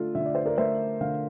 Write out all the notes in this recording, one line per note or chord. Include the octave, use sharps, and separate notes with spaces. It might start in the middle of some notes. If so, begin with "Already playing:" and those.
Already playing: D3 A3 D4 F4 A4
D3 E5
D5
C5
A#4 D5
A3 C5 E5
D3 F5